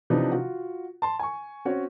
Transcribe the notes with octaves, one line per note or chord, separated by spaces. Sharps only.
C3 E3 F3 D4 D#4 B4
F4 F#4
A5 C6
G#5 C#6
C4 C#4 F#4 C#5